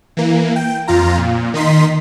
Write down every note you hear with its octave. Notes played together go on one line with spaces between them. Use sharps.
E3 A#3
G5
F2 F4 A#5
A#2
D#3 D#4 C6 B6